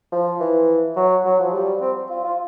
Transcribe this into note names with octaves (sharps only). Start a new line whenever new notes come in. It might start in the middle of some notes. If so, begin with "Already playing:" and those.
F3
E3
F#3
F#3
F3
G3
C4
F4
F4